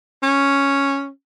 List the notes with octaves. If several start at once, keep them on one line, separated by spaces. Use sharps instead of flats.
C#4